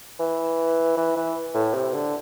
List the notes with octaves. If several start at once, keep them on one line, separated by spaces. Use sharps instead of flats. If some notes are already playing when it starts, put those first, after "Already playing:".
E3
E3
E3
A2
C3
D3